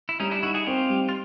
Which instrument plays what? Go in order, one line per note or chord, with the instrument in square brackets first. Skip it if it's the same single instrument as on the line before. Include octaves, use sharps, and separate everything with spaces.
[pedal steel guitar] E4
[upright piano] G3 [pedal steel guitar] C#4 D#4
[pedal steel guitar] D4 E4
[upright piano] D#4 [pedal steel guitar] E4 F#4
[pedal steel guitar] F#4 G#4
[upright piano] C4 [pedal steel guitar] F4 G4
[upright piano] G3
[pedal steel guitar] F4